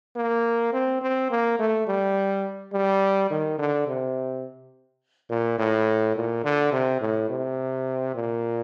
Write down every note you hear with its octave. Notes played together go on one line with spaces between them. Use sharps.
A#3
C4
C4
A#3
A3
G3
G3
D#3
D3
C3
A#2
A2
A#2
D3
C3
A2
C3
A#2